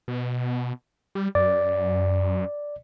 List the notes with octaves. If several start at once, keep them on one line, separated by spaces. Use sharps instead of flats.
B2
G3
F#2 D5